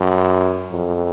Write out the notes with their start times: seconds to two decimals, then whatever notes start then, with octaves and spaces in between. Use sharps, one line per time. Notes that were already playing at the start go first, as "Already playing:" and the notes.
Already playing: F#2
0.72 F2